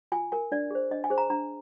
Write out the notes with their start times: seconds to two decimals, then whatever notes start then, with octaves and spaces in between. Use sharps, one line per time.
0.12 F4 G#5
0.32 A#4 G#5
0.52 D4 D5
0.71 G#4 C5
0.91 D4 D#5
1.04 G#5
1.10 G#4 C5
1.18 A#5
1.30 D4 A#5